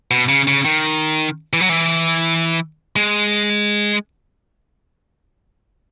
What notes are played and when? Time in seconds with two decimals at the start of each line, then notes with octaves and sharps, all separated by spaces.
0.11 B2
0.29 C#3
0.48 C#3
0.65 D#3
1.53 E3
1.61 F#3
1.69 E3
2.96 G#3